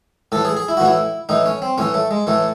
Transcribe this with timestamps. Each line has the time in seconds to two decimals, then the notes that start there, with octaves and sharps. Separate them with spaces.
0.32 A2 E3 A4
0.45 G#4
0.57 G#4
0.69 E4
0.77 F#4
0.80 A2 E3 E4
1.29 A2 E3 D#4
1.46 C#4
1.62 C4
1.78 A2 E3 C#4
1.94 A3
2.11 G#3
2.27 A2 E3 A3